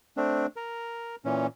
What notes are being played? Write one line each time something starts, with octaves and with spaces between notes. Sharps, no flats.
A3 C4 D4
A#4
A#2 E3 C#4